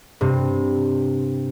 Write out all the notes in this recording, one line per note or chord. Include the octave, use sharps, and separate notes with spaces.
G2 C3